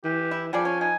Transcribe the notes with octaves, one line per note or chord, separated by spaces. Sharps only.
E3 G4
E4
F3 G3 G#4 D5
C#4 G#5
D#4 G#5